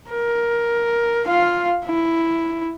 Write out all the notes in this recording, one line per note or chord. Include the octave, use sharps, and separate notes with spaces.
A#4
F4 F5
E4